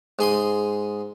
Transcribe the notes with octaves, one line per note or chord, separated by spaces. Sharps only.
G#2 G#4 C6 D#6